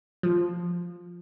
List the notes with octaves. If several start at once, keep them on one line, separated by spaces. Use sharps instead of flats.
F3